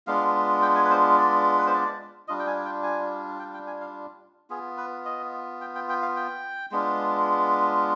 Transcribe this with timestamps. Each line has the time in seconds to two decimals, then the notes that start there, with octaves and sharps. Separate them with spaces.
0.07 G#3 B3 D4 F4 F5
0.62 G5
0.75 G#5
0.85 B4
0.90 C5
1.18 D5
1.58 B4
1.66 C5
1.74 D5
2.28 G3 D4 F4 D#5
2.39 G5
2.47 G#5
2.65 G5
2.83 G#5
3.39 G5
3.54 G5
3.67 G#5
3.81 F5
4.50 B3 F4 G#4
4.77 B4
5.05 D#5
5.61 G5
5.75 G5
5.89 G5
6.02 F5
6.16 G5
6.71 G#3 B3 D4 F4